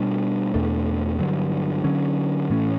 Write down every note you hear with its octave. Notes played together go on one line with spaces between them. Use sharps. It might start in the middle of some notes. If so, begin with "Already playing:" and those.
Already playing: B2 G3 D4
E2 B2 A3 D4
G2 D3 F#3
D3 F#3 C#4
A2 E3 A3 C#4